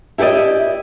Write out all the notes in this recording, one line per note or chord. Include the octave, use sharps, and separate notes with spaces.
E4 G4 A4 D5 D#5